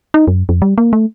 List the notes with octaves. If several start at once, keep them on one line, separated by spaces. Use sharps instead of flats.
D#4
F#2
F2
G3
A#3
A3